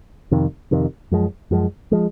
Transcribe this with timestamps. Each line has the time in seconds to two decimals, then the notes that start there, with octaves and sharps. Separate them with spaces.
0.31 F2 C3 D#3
0.71 F2 C3 D#3
1.11 F#2 F3 G#3
1.51 F#2 F3 G#3
1.92 F3 G#3